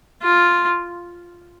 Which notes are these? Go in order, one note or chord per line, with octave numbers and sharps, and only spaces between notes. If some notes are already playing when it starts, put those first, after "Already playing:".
F4